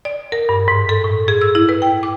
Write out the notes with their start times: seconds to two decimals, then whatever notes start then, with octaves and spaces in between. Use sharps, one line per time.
0.05 D5
0.32 A#4
0.49 G2
0.68 G#2
0.89 A4
1.04 A2
1.28 G#4
1.41 E6
1.55 E4
1.69 B4
1.82 G5
2.03 D6